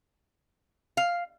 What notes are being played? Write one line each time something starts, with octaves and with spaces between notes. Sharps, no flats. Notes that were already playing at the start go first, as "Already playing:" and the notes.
F5